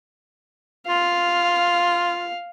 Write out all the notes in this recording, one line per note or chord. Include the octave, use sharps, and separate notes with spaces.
F4 F5